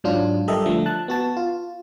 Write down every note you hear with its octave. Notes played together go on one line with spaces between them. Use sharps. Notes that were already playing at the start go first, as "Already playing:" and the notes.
G#2 F#3 D4 F4
G3 G4 A4 A#4 D#5 E5
D3 F3 A3
A5 F#6
B3 F#4 A5
F4